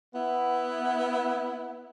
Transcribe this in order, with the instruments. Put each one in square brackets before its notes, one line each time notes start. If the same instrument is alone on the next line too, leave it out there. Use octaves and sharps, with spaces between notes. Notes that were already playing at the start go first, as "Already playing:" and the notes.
[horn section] B3 E4